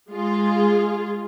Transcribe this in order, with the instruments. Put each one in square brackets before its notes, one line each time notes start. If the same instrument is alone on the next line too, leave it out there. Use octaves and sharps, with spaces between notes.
[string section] G#3 F4 G#4